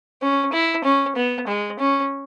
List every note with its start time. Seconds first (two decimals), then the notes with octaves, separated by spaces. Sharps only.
0.22 C#4
0.53 E4
0.84 C#4
1.16 B3
1.48 G#3
1.79 C#4